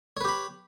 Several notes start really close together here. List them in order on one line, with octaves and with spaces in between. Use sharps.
C#5 B4 G4 B5